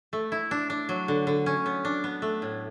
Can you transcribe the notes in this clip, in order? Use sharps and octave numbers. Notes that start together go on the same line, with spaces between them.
A3
E4
D4
D4
F#3
D3
D3
C#4
B3
D4
B3
A3
A2